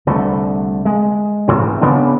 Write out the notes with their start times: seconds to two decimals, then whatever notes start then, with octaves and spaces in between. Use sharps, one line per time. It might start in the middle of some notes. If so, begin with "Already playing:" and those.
0.07 C2 D3 A3
0.85 G#3
1.48 A1 G#2 C4
1.81 C#3 B3 C4 D4